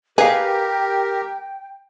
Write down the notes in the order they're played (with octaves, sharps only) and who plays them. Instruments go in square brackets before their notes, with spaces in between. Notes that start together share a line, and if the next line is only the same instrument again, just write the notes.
[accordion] G4 A#4 [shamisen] G#4 [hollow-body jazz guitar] B4 F5 [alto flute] G5